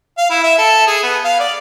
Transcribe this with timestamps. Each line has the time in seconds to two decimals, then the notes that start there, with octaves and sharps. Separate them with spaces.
0.17 F5
0.30 E4
0.43 E5
0.58 A4
0.87 G#4
1.03 B3
1.25 F5
1.40 D5